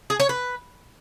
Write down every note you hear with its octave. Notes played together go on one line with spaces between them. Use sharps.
G#4
C#5
B4